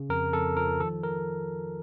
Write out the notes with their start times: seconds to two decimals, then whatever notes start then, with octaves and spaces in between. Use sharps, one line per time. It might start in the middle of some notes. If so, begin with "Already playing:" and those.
Already playing: C#3
0.09 F2 A#4
0.33 F2 A4
0.57 F3 A#4
0.80 D#3 A4
1.03 A#4